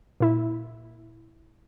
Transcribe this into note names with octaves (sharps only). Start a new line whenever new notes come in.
A#2 E4